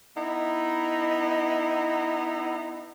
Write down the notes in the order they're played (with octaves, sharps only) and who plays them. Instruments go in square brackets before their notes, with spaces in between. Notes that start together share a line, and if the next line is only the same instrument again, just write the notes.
[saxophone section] B3 D#4 E4